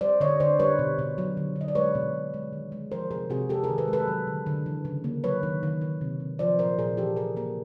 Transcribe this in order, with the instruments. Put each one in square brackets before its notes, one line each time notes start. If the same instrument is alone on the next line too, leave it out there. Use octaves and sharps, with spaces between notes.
[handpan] G3 C5 D5
D3 C#5 D#5
D3 C5 D5
G3 B4 C#5
B2
B2
F#3
D3
D3
D#5
D5
G#3 B4 C#5
B2
G#3
G#3
D#3
G#3
F3 A#4 C5
C3 G#4 A#4
C3 F#4 G#4
G#3 G4 A4
G#4 A#4
D#3
A4 B4
G#3
A4 B4
F#3
D3
D3
E3
C#3
A#3
F#3 B4 C#5
D#3
D#3
D#3
C3
C3
F3 C5 D5
A#2 A#4 C5
A#2 G#4 A#4
E3 G4 A4
C#3 G#4 A#4
A#3 G#4 A#4